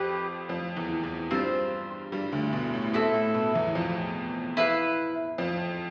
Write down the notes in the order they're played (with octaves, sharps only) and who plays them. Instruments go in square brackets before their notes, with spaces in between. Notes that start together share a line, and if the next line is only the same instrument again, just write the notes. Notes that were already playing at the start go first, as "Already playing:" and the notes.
Already playing: [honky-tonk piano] F2 F3 [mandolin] G4 B4
[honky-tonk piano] F2 F3
E2 E3
E2 E3
[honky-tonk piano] G2 G3 [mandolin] C4 F4 C5
[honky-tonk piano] G2 G3
D2 D3
B2
A2
[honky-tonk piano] B2 [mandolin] C4 E4 A4
[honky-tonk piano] A2
B2
E2 E3
F2 F3
[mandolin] E4 B4 F5
[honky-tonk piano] F2 F3